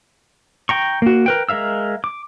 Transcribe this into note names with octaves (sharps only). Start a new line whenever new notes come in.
G5 A#5 C#6
A#3 F#4
A#4 B4 G5
G#3 A#4 E5 F5 E6
D6